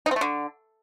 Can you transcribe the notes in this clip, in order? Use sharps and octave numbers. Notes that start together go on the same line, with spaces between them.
D#4
C4
A3
D3